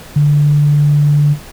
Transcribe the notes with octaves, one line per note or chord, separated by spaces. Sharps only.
D3